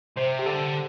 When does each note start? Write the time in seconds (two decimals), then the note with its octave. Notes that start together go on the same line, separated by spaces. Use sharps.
0.17 C3 C5
0.39 G4
0.46 D3 A4